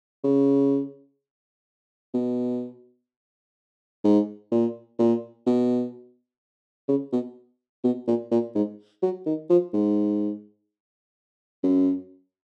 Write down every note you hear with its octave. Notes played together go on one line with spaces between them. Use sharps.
C#3
B2
G#2
A#2
A#2
B2
C#3
B2
B2
A#2
A#2
G#2
F#3
D#3
F3
G#2
F#2